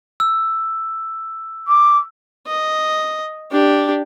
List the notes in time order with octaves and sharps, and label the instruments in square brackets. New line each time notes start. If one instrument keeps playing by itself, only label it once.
[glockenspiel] E6
[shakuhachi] D6
[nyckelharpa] D#5
D4 G4